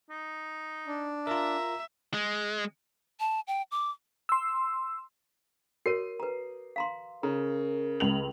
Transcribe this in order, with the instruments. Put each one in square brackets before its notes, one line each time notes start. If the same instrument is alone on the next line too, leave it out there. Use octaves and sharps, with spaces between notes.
[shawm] D#4
[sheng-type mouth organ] D4
[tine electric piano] F4 A#4 [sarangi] E5 [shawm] A#5
[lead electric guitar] G#3
[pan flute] A5
G5
D6
[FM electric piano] C6 E6
[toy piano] F#4 A#4 C#5 [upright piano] C7 D#7
[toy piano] B4 A#5
F5 A#5 C6
[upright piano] C#3 [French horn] A#4 [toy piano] A#5
[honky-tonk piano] C#2 F7 F#7